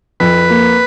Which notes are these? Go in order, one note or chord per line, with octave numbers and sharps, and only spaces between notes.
F2 B4
A#3